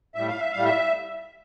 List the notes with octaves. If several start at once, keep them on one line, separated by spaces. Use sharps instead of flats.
A2 G3 E5
F5
E5
A2 G3 F5
E5